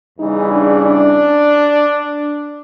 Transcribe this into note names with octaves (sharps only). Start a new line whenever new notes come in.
E2 C#3 E3 G3 D#4
D4
D4